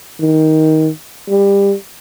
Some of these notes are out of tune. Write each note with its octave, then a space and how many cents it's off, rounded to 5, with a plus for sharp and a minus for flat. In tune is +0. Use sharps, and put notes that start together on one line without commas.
D#3 +15
G3 +25